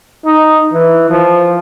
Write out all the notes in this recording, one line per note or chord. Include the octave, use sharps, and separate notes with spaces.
D#4
E3
F3